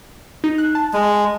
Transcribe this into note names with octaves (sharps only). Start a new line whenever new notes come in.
D#4
F#6
A5
G#3